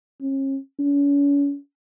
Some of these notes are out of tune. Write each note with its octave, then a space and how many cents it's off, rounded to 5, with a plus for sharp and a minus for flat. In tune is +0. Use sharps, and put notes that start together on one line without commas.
C#4 -40
C#4 +40